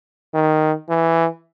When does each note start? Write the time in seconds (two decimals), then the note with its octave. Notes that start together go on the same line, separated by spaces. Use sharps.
0.34 D#3
0.89 E3